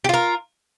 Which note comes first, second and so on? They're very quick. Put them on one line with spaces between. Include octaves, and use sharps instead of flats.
G4 F4 A#4